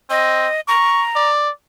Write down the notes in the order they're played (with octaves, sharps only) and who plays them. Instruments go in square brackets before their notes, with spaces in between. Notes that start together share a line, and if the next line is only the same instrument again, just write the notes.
[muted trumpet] C4 [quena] D#5
[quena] A#5 [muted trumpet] C#6
[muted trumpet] D5